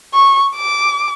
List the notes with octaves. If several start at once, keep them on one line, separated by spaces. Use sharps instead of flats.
C#6
D6